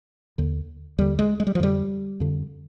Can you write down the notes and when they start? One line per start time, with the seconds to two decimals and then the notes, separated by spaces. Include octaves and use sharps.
0.38 D#2 D3
0.98 D#2 D3 G3
1.19 G#3
1.40 G#3
1.47 G3
1.55 F3
1.60 F2 D3 G3
2.20 F2 D3